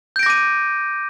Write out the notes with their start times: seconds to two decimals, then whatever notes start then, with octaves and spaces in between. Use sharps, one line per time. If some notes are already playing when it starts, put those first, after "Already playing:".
0.16 G6
0.19 D7
0.23 A#6
0.26 D6
0.30 D#7